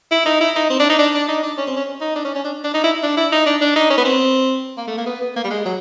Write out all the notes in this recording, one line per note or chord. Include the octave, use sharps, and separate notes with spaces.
E4
D#4
E4
D#4
C4
D4
D#4
D4
D4
D#4
D4
C#4
C4
C#4
D#4
D4
C#4
C#4
D4
D4
D#4
E4
D4
E4
D#4
D4
D4
D#4
C#4
B3
C4
A#3
A3
A#3
B3
B3
A#3
G3
G#3
F#3